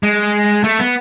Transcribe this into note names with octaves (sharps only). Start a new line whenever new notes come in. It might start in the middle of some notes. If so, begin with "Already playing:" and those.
G#3
A3
B3